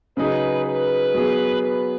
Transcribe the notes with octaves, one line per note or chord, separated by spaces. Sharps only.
C#3 F#3 D#4 G#4 B4
B4
F#3 B3 G#4
B4